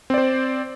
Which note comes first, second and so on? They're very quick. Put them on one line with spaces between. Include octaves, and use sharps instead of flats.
C4 D5 C5